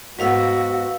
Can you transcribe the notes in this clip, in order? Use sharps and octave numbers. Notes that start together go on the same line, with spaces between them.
G#2 B3 F#4 B4 F5 E6